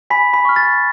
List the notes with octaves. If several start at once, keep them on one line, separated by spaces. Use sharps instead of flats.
G#5 B5 B6
B5 B6
C#6 F6
A6